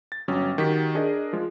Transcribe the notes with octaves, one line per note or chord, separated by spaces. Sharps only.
A6
G1 F#3 C#4
D#3 F#4 G4 B6
D4 G#4 A#4 D#5
F3 G#3